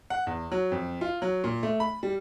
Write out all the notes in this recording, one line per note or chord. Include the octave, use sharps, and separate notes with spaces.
F#5
E2
F#3
F2
F4
F#3
A#2
A3
B5
G3